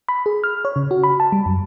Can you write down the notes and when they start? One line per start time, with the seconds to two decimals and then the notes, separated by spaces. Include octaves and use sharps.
0.09 B5
0.26 G#4
0.44 F6
0.65 C#5
0.76 C#3
0.91 F#4
1.03 B5
1.20 A5
1.32 G3
1.46 F#2